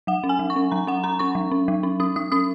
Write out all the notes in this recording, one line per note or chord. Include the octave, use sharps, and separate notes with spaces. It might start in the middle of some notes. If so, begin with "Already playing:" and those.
F#3 F#5
C#4
G#5
F#3
C#6
C#4
F#3 A#5
C#4 F#5
C#4 A#5
C#4 C#6
F#3
C#4
F#3
C#4
C#4 D#6
F#3 D#6
C#4 D#6